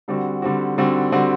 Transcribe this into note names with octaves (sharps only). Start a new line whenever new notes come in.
D3 G3 C4 F#4
D3 G3 C4 F#4
D3 G3 C4 F#4
D3 G3 C4 F#4